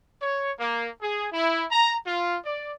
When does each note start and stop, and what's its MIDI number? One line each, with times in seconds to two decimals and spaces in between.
0.21 0.52 73
0.60 0.89 58
1.01 1.27 68
1.32 1.63 64
1.71 1.96 82
2.07 2.37 65
2.45 2.73 74